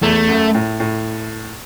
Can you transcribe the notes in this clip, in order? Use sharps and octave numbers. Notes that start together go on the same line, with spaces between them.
E2 A3
F#2
A2
A2